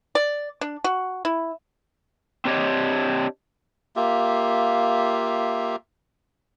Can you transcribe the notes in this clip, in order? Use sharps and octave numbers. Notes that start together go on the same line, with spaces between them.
D5
D4
F#4
E4
C4 D4 G4 C#5 D#5
A#3 F4 G4 E5